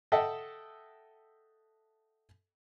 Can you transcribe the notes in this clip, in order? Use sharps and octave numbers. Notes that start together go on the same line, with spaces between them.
A4 D#5 E5 F#5 G5 A5